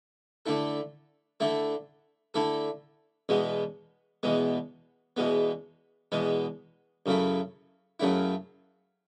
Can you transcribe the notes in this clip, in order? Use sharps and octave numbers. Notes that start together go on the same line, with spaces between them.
D3 A3 E4 A4
D3 A3 E4 A4
D3 A3 E4 A4
E2 B2 G#3 B3
E2 B2 G#3 B3
E2 B2 G#3 B3
E2 B2 G#3 B3
F#2 C#3 F#3 A3 E4
F#2 C#3 F#3 A3 E4